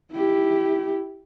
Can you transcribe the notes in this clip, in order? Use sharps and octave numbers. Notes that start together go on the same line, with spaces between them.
E4 G4